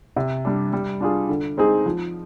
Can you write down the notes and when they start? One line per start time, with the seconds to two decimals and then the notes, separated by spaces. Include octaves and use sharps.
0.16 C3
0.45 G3 D4
0.73 G3
1.01 D4 F4 G#4
1.29 D3
1.57 G#3 C4 D#4 G#4
1.86 F3